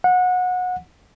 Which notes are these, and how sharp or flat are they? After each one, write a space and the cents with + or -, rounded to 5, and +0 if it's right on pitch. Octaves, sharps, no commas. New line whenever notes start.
F#5 -25